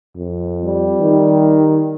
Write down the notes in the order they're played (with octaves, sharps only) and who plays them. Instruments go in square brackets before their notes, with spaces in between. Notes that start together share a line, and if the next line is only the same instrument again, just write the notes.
[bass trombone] F2
[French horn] G3
[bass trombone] D#3